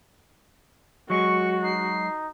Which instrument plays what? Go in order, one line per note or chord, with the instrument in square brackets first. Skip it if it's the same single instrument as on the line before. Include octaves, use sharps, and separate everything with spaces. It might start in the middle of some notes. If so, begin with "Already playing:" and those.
[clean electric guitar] F#3 G#3 [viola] F#4 [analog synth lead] C#6
[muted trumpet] D#4 [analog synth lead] C7